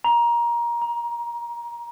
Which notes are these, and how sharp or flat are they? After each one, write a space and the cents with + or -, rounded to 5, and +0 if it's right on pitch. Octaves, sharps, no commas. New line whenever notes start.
A#5 +20
A#5 +45